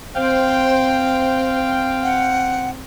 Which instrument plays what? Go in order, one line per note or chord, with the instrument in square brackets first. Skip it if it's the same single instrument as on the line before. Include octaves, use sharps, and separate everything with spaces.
[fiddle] C4 [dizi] C5 [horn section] F5 G5
[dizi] F#5